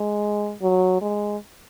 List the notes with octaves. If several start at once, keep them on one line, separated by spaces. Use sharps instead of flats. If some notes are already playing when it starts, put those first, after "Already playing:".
Already playing: G#3
F#3
G#3